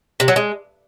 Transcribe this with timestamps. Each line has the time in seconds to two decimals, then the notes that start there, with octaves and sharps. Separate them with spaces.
0.20 C3
0.28 F#3
0.36 G#3